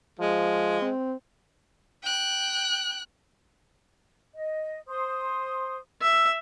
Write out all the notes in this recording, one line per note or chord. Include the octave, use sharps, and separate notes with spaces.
F3 G#3
C4
G5 F#6
D#5
C5 C6 D#6
E5 E6